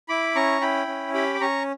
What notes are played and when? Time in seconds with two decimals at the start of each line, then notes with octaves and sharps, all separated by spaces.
0.08 E4 B5 D6
0.35 C#4 A#5 C#6
0.61 E4 G5 B5
0.87 C#4
1.14 G4 G5 B5
1.34 D6
1.41 C#4 A#5 C#6